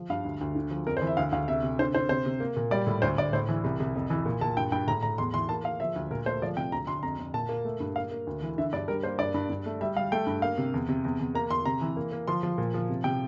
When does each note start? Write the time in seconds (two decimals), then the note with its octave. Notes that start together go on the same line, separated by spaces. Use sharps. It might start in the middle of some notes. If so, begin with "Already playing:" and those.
Already playing: F3
0.10 G2 F5
0.25 D2
0.41 D2
0.55 D3
0.71 F3
0.87 F2 A#4
0.97 C5
1.02 E3
1.07 E5
1.17 D2 F5
1.32 D2 F5
1.48 C3 E5
1.63 C3
1.79 D3 C5
1.94 D3 C5
2.09 C3 C5
2.26 C3
2.40 A#3
2.56 A#2
2.71 G3 D5
2.87 A2
3.02 D2 C5
3.18 D2 D5
3.33 A2 C5
3.49 E3
3.64 C2
3.80 C2
3.96 F2
4.10 E3
4.26 A#2
4.41 A#2 A5
4.57 G2 G5
4.72 G2 G5
4.87 A2 A#5
5.03 A2 A#5
5.18 E2 C6
5.34 E3 C6
5.49 A#3 A5
5.64 A#3 F5
5.80 F3 E5
5.96 D2
6.11 A#2 A#4
6.26 A3 C5
6.42 F3 D5
6.57 C3 G5
6.72 D2 A#5
6.87 D2 C6
7.03 F2 A#5
7.19 F2
7.34 A#2 A5
7.49 A#3
7.65 A3
7.80 G2
7.96 A#3 F5
8.12 A#3
8.27 D2
8.42 E3
8.58 D3 E5
8.73 G2 D5
8.88 G3 A#4
9.03 A#3 C5
9.19 G2 D5
9.34 G2
9.50 G2
9.66 A3
9.81 G3 E5
9.97 G3 F5
10.12 A3 G5
10.27 G2
10.42 A#3 F5
10.58 C3
10.74 E2
10.89 C3
11.05 E2
11.20 E2
11.35 A#3 A#5
11.50 E2 C6
11.65 C3 A#5
11.81 E3
11.97 A#3
12.12 A#3
12.28 F3 C6
12.43 F3
12.58 A#2
12.74 F3
12.90 C3
13.04 C3 G5